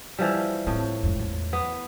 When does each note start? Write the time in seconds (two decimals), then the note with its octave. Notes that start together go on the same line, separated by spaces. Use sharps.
0.19 E3 F3 G3
0.67 A2 C4
1.03 G#1 F2
1.19 E2
1.53 B3